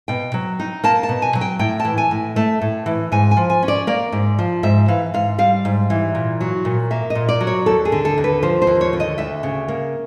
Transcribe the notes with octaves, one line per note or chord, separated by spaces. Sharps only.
B2 G5
F#3
D#4
A#3 A5
A5
B2
G#5
F#3
G5
A2 G5
A5
E3
G#5
A2
A3 A5
A2
E3
G#2 G#5
G#5
F3
G#5
C#4
D5
A#3 D5
G#2
F3
G#2 E5
E3 F5
G#2 F5
G3 F5
G#2
E3
A#2
F#3
A#2
A#3 E5
D#5
A#2
D5
F#3
C#5
D#2 A4
G#4
D3
A4
D#2
B4
F3 C5
C5
D#2
C#5
D3
D#5
D2 E5
C#3
A#3